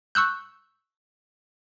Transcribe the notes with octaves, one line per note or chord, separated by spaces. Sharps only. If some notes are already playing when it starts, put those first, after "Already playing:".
C#6 E6 F#6 G6